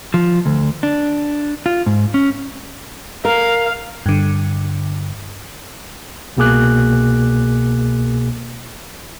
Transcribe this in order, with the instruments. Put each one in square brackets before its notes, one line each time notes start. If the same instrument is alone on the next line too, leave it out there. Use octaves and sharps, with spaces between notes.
[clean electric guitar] F3
D2
D4
F4
G#2
C#4
[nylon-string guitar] A#4 [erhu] F5
[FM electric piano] G2 D3
[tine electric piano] C2 B2 A#3 G#4 D6 F#6